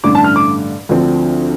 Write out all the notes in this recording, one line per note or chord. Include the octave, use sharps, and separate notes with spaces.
A1 G2 D3 A3 D6
A5
F6
D6
D2 D3 F3 C4